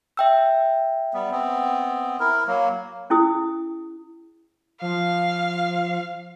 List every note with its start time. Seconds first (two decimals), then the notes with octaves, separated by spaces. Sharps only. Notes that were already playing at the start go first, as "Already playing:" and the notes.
0.17 E5 G5 E6
1.14 G3 B3
1.31 B3 C4
2.20 E4 A#4
2.47 F#3 A#3
3.10 C#4 E4 G#4 D#6
4.82 F3 F5